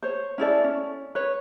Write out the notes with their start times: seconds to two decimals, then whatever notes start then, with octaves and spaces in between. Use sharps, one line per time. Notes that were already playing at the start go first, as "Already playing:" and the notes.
0.03 C5 C#5
0.38 C#4 E4 A4 D5
0.64 C#4
1.15 B4 C#5